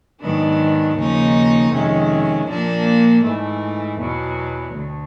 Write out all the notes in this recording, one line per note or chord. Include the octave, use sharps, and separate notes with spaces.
G#2 D#3 F#3 B3 D4
D#2 C#3 F3 A#3 D#4
F2 C3 D#3 G#3 C#4
A#2 F3 A#3 D4
G#2 E3 A3
E2 B2 F#3
D2